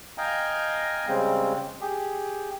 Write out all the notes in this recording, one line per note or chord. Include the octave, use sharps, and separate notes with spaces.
D#5 F5 G5 G#5 A#5
C#3 G3 G#3 C4
G4 G#4